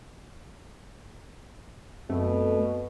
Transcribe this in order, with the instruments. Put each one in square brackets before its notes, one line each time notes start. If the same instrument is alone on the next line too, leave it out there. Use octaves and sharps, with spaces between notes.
[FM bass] F#2 [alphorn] B2 [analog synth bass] A3 [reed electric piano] C4